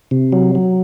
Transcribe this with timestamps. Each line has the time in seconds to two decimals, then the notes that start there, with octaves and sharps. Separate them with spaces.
0.11 C3
0.32 F#3
0.55 F#3